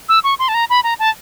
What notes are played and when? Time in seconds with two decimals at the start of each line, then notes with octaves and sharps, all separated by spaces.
0.09 E6
0.24 C#6
0.39 C6
0.48 A5
0.54 A#5
0.70 B5
0.84 A#5
0.99 A5